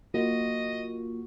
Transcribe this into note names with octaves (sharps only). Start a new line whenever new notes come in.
A#3 F4 F#4 D#5